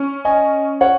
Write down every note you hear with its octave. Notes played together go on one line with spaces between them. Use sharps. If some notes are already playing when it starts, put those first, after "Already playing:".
Already playing: C#4
D#5 G#5
C#5 F#5